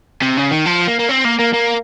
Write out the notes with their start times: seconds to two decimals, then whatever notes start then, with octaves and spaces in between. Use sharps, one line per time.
0.22 C3
0.37 C#3
0.51 D#3
0.66 F3
0.88 A#3
1.00 A#3
1.09 C4
1.25 A#3
1.39 A#3
1.53 A#3